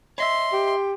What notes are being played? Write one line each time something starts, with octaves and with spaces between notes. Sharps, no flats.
C#5 D#5 E5 C6
G4